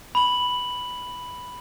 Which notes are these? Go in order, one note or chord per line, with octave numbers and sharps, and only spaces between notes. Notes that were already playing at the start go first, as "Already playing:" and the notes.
B5 F#7